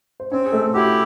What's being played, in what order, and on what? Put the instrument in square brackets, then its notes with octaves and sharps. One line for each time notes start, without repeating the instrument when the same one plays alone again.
[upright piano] C5
[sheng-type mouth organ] C4 [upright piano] C#4 C#5
[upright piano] G#4
A3 A4
[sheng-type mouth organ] E4 G4 [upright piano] F#4